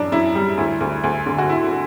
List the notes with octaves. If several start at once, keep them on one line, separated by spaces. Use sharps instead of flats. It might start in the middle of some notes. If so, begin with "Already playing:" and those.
Already playing: F#2 E3 D4
F#2 E4
G3
D2 E4
D2
D2
D3
F#4
A3 E4
A3